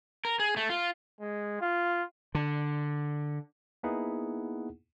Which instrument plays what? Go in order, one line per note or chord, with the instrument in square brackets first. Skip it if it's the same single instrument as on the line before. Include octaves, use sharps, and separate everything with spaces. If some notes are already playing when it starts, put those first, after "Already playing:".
[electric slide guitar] A#4
G#4
A3
F4
[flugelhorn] G#3
F4
[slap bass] D3
[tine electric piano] A#3 B3 D#4 E4 G#4 F#5